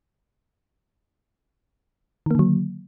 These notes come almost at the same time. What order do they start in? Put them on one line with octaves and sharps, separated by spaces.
D#3 A#3 D3 F#3